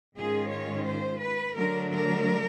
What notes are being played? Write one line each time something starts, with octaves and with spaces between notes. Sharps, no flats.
G#2 D#3 G#3 C#4 F4 G#4
C#5
C5
B4
D3 F#3 A3 D4 A#4
A#4